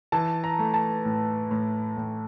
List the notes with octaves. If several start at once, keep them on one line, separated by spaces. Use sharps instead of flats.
E3 A5
A#5
A3
A5
A2
A2
A2